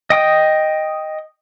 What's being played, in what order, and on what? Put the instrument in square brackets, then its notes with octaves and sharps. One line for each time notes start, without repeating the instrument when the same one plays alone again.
[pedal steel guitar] D#5 G5 D#6